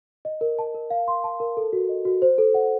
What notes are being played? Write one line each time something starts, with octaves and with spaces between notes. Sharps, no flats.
D#5
A#4
A5
A#4
F5
C6
A5
A#4
A4
F#4
D#5
F#4
C5
A4
F#5